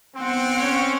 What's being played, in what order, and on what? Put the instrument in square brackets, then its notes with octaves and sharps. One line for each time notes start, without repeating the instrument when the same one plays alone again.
[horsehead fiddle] B3 F#5 [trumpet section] C4
[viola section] C#4 C#5